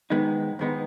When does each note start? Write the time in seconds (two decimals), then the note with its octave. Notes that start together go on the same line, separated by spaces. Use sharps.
0.10 G#2 D#3 G#3 B3 D#4
0.59 G#2 D#3 G#3 B3 D#4